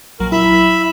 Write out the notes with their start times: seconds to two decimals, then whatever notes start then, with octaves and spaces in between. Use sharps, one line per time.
0.20 A#1 F#3 A#4
0.32 E4 E5 B5